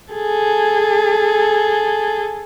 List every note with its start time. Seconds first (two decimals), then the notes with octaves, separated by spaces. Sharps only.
0.14 G#4 A4